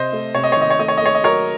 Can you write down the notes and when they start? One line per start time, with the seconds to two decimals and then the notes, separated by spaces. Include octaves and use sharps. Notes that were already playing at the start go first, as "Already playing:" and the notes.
Already playing: C3 C5 D#5
0.12 A3
0.35 C3 C#5
0.44 D#5
0.52 C#5
0.57 D#3 D#5
0.70 C#5
0.79 A3 D#5
0.88 C#5
0.97 D#5
1.01 A3 C#5
1.15 D#5
1.23 F#3 A#4 C#5